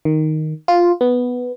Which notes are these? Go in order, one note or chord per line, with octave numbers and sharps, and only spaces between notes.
D#3
F4
B3